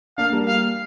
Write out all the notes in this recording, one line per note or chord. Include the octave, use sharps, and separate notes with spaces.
A#3 D4 F5
G3 A#3
F5